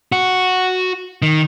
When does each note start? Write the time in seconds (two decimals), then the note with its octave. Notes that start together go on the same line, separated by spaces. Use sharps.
0.12 F#4
1.22 D#3